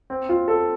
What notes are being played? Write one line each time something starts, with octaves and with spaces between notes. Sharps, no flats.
C4
F4
A4